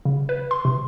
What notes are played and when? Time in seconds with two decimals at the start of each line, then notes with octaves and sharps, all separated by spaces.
0.05 C#3
0.29 B4
0.51 C6
0.65 C3